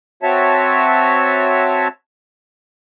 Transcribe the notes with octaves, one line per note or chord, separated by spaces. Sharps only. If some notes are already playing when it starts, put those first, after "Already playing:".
C4 F#4 C#5 E5 A5